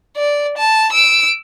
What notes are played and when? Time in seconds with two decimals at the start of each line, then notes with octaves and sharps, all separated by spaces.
0.17 D5
0.58 A5
0.93 E6 D7